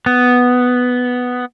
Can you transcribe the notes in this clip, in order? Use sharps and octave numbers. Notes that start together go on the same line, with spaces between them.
B3